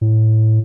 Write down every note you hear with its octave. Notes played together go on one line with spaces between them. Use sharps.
A2